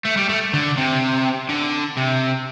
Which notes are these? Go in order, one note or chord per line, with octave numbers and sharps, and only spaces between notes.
A3
G3
A3
D3
C3
D3
C3